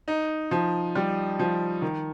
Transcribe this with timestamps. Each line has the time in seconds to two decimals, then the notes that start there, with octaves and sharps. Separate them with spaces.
0.08 D#4
0.51 F3
0.95 G3
1.39 F3
1.82 D#3